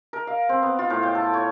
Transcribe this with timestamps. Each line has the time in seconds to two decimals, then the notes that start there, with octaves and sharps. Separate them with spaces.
0.13 A#4
0.27 F5
0.49 C4
0.63 B3
0.79 F4
0.90 A2
1.03 G5
1.15 A4
1.34 C#5